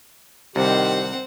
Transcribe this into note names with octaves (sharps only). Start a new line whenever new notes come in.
C2 D#3 C4 G4 F#5